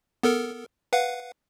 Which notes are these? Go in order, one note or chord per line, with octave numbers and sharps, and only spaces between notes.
B3 A4 A#4
B4 F5 F#5